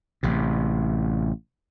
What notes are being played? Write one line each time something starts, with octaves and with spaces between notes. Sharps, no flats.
A1 C3